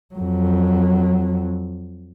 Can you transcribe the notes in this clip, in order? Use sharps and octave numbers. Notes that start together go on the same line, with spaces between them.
F2 F#3